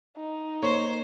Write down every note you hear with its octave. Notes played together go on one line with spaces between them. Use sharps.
D#4
A#3 C5 C#5